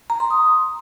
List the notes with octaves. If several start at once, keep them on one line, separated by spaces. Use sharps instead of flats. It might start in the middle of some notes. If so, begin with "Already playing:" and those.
A#5
C6
D#6